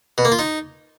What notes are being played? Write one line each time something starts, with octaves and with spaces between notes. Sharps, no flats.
B2
A#3
F4
D#4